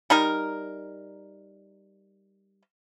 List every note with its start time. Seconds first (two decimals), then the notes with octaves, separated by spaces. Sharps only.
0.10 G3 D#4 A#4